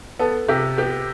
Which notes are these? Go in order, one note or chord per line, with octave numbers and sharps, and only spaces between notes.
B3 A4
C3 G4
B3 G4